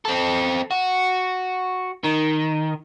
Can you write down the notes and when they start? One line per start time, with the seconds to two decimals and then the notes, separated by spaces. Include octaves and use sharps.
0.05 C4 A4
0.71 F#4
2.04 D#3